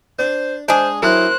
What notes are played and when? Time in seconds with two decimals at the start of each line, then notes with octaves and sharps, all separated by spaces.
0.19 D4 C5
0.68 G#3 D4 G#4 C5
1.02 F#3 E4 A#4 C5 F#6